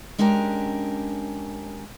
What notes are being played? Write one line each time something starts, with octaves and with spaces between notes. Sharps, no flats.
G#3 C#4 D4 G4 A#4